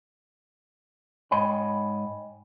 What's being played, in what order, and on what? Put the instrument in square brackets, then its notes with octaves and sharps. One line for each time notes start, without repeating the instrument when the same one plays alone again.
[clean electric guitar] G#2 C#5 D#5 G5 B5